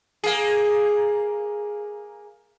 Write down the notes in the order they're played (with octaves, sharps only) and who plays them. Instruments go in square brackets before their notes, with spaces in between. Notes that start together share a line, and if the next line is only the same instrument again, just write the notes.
[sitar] A#3 G#4